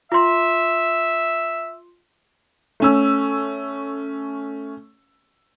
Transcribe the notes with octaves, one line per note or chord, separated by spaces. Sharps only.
F4 E5 C6
A3 C#4 E6